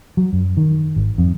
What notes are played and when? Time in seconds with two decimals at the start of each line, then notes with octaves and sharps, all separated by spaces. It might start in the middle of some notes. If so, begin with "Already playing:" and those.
0.17 F#3
0.33 F#2
0.57 D#3
0.96 G#1
1.18 F2